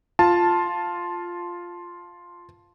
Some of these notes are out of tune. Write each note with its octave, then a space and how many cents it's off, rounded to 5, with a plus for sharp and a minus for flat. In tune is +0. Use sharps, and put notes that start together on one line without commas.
F4 +0 A5 +0